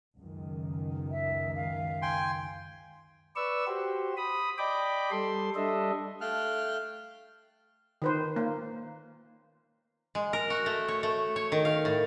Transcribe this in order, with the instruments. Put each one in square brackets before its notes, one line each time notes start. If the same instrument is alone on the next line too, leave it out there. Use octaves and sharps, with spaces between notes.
[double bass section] C#2 F#2 D#3
[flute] E5
F5
[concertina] G5 G#5 C6
[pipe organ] B4 D5 C#6 E6
F#4 G4 C5
B5 D#6
D5 D#5 G5 B5 D6
G3 A4 C6
G3 D4 A4 D#5 E5
[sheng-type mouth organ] A3 F5 G5 A5 F6 F#6
[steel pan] D#3 B4 C5
A#3
[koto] G#3
A#4
F#4
A3
C#5
A3
C#5
D#3
F5
A2